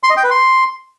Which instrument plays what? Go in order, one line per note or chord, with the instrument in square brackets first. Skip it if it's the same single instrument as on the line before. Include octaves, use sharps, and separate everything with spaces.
[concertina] C6
D#5
G5
B4
C6